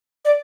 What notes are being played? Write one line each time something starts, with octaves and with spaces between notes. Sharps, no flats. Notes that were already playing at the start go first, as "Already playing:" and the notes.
D5